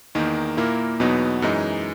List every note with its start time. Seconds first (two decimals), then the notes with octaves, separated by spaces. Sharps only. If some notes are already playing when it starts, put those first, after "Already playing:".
0.15 E2 D#3 A#3 D#4
0.57 A#2 A#3 E4 A#4
1.00 E2 B2 F#3 B3 D#4
1.42 F#2 E3 G#3 D#4